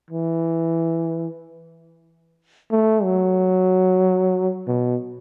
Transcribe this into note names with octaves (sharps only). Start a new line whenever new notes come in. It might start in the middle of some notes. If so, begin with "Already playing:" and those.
E3
A3
F#3
B2